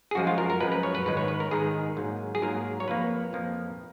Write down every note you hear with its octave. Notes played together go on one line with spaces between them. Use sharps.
G#4
F#2 F3 G#3 F#4
F4
A#4
A#4
F#2 F3 G#3 B4
B4
C#5
B4
G#2 D#3 G#3 B4
C#5
B4
A#4
G#2 D#3 G#3 G#4
G#2 F#3 A#3
G#4
G#2 F#3 A#3 A#4
C#5
F2 F3 A#3 B4
F2 F3 A#3